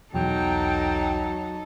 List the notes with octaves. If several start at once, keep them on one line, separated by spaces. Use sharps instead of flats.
B1 E2 F#3 D#4 A4 G5